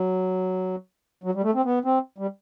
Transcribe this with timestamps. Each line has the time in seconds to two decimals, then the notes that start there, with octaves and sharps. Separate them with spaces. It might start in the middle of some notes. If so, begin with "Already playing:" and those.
Already playing: F#3
1.24 F#3
1.35 G3
1.44 A3
1.55 C4
1.65 B3
1.85 C4
2.18 G3